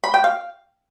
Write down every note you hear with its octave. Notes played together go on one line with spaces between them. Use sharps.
B5
G5
F5